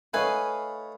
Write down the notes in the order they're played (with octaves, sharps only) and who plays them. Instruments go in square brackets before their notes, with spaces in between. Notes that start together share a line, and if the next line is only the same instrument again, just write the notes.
[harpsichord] A3 D#4 C#5 [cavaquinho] B4 F5 G#5